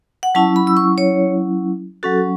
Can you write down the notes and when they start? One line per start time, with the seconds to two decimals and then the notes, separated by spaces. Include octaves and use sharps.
0.23 F#5
0.35 F#3 C#4 E4 A5
0.56 B5
0.67 E6
0.77 C#6
0.98 C#5
2.03 F#3 C#4 F#4 A4